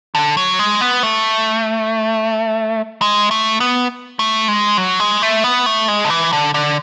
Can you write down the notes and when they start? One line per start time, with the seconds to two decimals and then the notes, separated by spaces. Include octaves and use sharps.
0.15 D3
0.37 F#3
0.59 G#3
0.81 B3
1.03 A3
3.01 G#3
3.31 A3
3.60 B3
4.19 A3
4.48 G#3
4.77 F#3
5.00 G#3
5.22 A3
5.44 B3
5.66 A3
5.88 G#3
6.05 D3
6.10 E3
6.33 D3
6.54 D3